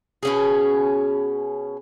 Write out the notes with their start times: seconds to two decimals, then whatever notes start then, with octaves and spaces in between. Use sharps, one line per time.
0.23 B2 C#4 G#4